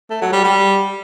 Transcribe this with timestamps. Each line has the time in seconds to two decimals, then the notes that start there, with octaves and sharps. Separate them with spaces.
0.10 A3
0.21 F#3
0.33 G3
0.44 G3